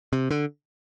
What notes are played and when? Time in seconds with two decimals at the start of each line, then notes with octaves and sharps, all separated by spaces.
0.13 C3
0.31 D3